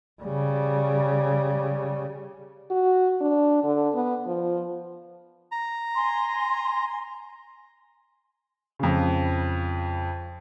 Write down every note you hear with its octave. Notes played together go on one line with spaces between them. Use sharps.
C#3 G3
F#4
D4
D3
B3
F3
A#5
G#5 C6
F2 C#3